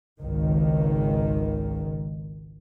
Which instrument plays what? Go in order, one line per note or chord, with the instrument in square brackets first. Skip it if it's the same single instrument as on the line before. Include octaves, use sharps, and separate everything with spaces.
[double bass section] G#1 C#2 D#3